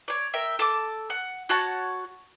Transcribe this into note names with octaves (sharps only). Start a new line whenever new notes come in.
C#5 D5
A#4 E5 G5
A4 A5 D6
F#5
F#4 C#5 F#5 A5